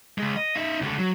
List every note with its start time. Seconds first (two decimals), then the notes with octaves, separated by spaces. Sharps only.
0.18 C#3 G#3
0.36 D#5
0.56 D#4 E5
0.82 C#2 D3
0.98 F#3